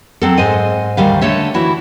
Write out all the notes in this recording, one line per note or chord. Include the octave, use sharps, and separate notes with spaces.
F#3 C4 A4
G#2 C5 D#5 G#5
D2 D#3 G3 F5
D3 A3 C#5 E5
E3 E4 F#4